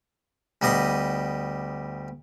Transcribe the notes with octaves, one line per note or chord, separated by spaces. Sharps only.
D2 G3 B3 D#5 D#6